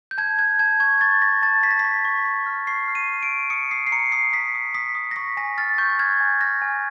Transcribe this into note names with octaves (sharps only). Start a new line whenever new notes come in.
G6
A5 G#6
F#6 G#6
A5 G#6
C#6 G#6
C#6 A6
C#6 A#6
A5 A6
A5 B6
A#6
C#6 B6
C#6
C#6
F6
C#6 C7
F6
D#7
C#6
D7
C#6
D#6 C#7
D#6 C7
C7
A#5 C#7
D#6 C7
D#6 B6
D#6
D#6 B6
D#6
A#6
C#6 B6
G#5 A#6
F6 A6
C#6 G6
F6 G#6
G#5
F6 A#6
G#5